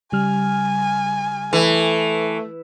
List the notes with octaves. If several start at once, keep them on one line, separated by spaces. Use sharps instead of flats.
C#3 G3 G#5 F6
E3 A3